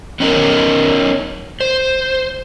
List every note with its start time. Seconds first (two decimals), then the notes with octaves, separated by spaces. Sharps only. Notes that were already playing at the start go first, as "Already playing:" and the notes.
0.20 B3 C#4 D#4 F4 A#4 C#5
1.60 C5